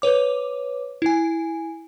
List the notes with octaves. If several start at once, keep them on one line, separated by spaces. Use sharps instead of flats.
B4 C#5 D6
E4 G#5